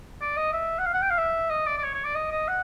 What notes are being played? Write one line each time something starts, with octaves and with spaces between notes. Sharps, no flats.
D5
D#5
E5
F#5
F5
F#5
G5
F5
E5
D#5
D5
D5
C#5
C#5
D5
D#5
D#5
F#5